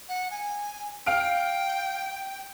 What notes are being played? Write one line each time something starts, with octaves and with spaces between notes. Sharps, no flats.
F#5
G#5
F5 G5 F6 D7